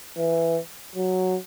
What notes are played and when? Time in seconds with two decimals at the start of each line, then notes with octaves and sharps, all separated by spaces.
0.18 E3
0.95 F#3